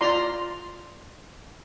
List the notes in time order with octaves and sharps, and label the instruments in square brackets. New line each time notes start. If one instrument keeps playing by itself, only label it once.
[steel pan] F4 D5 A#5 C6